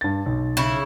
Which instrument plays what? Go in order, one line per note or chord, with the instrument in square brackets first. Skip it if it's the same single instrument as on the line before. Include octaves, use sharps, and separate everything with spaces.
[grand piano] G2 A6
B1
[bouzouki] C#3 E4